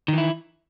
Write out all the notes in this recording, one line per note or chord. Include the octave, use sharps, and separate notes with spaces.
D#3 E3 E4